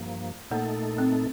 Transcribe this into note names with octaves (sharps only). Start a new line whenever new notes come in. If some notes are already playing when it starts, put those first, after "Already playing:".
Already playing: G2 F3 A#3
A#2 A3 A#3 D#4 A4
C4